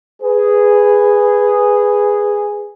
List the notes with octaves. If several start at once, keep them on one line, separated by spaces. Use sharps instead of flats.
G#4 B4